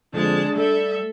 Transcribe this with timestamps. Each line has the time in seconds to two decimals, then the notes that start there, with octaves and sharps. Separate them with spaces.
0.13 F2 D3 G#3 D4 A5
0.56 G3 A3 A4 D5 E5